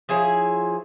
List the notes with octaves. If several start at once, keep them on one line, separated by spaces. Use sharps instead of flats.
F3 E4 G#4 C#5